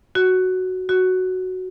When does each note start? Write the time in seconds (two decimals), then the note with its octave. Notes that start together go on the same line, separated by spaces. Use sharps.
0.15 F#4
0.89 F#4